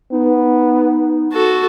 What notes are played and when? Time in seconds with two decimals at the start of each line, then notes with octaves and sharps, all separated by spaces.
0.12 B3 D#4
1.33 F#4 A4